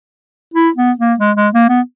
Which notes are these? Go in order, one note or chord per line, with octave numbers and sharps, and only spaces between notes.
E4
B3
A#3
G#3
G#3
A#3
B3